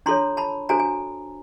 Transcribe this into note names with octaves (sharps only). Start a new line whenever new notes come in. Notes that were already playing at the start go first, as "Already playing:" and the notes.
D4 F4 A4 C#5 A#5 C6
A5 B5
D4 F#4 A4 C5 G#5 A#5
G#5